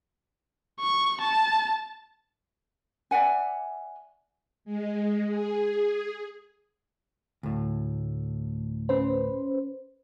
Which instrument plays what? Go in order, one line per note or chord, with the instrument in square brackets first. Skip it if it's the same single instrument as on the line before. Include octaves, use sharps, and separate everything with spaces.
[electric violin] C#6
A5
[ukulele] D5 E5 F#5 G#5
[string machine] G#3
G#4
[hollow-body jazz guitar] D2 A2
[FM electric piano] C#4 B4 C5